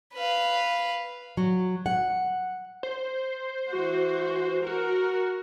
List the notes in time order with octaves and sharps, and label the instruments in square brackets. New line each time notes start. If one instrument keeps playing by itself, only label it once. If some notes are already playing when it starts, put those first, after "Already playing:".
[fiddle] B4 F5
[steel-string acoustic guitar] F#3
F#5
[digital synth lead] C5
[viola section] E3 F#4
[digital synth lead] F#4 [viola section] A#4